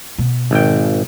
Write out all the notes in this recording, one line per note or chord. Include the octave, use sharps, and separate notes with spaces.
B2
G#1 G5